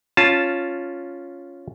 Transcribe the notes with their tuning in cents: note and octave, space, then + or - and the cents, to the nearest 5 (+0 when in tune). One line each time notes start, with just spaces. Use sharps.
C#4 +0 F4 +0 A5 +0